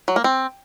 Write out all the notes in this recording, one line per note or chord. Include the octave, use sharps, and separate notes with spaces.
F#3
A#3
C4